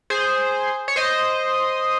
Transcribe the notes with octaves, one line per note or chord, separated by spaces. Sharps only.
G#4 C5
C#5
C5 D#5